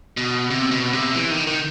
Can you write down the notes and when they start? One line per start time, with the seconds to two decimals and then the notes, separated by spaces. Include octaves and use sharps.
0.17 B2
0.50 C3
0.71 B2
0.93 C3
1.15 E3
1.31 D#3
1.47 D#3